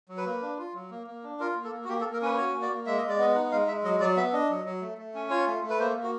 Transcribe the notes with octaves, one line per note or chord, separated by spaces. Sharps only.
F#3
B4
A#3
D4
F4
F#3
A#3
A#3
D4
F4 A#4
A#3
A4
A#3
F#4
A#3 G4
A4
A#3
A#4
C#4 B4
F#4 C#5
A#3
D5
A#3
G#3 E5
G#3 D#5
D5
B3 D#5
D#4 F#5
G#3 F5
G#3 E5
F#3 D#5
F#3 D5
B3 E5
D4 D#5
F#3
F#3
A3
A3
C#4
F4 C#5
A3
A3
B4
A#3 C5
A#3
F#4